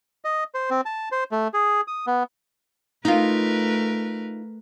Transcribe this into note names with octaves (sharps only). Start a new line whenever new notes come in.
D#5
C5
C4
A5
C5
A3
G#4
D#6
B3
A3 D#4 F4 A#4 B4